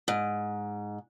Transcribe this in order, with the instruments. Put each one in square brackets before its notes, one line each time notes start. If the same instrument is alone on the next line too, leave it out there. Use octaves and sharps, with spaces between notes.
[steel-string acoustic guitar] G#2